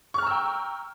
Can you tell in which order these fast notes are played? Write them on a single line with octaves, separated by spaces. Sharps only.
C#6 F6 A#5 E6 G5